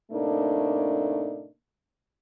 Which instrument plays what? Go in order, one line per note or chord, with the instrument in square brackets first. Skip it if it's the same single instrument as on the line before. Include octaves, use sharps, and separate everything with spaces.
[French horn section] A2 C3 A3 A#3 D4 D#4